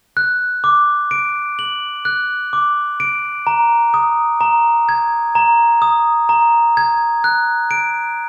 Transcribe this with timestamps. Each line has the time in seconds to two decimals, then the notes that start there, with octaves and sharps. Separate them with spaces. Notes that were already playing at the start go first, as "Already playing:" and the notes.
0.17 F#6
0.64 D6
1.11 D7
1.59 F#7
2.05 F#6
2.53 D6
3.00 D7
3.47 A#5
3.94 D#6
4.41 A#5
4.89 G#6
5.35 A#5
5.82 D#6
6.29 A#5
6.77 G#6
7.24 F#6
7.71 D7